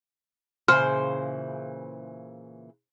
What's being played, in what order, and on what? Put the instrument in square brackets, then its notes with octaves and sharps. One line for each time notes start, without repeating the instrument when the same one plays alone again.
[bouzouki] A#2 C#3 E3 [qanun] C5 [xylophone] F6